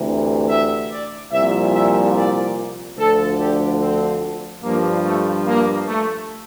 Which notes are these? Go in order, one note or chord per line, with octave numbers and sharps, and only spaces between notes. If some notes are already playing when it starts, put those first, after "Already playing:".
Already playing: D2 C3 E3
E5
D5
C2 A#2 F3 E5
E5
D5
D2 D3 F3 A4
G4
C4
G2 F3 A#3
A3
A#3
A3